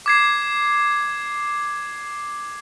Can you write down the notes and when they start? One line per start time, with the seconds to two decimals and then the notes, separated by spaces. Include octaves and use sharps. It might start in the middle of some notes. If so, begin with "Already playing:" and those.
0.06 D6 G#6 C7